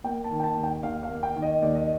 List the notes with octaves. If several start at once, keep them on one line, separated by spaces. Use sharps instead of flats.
A#3 G5
A5
D#3
G5
A5
D#2
G5
D#2 F5
F5
A#3
G5
D#3
D#5
D#2 D5
D#5